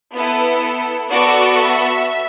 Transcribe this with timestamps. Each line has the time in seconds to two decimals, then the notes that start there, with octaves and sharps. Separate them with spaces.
0.15 B3 E4 A4 B4
1.10 B3 F#4 A4 D5
1.58 E5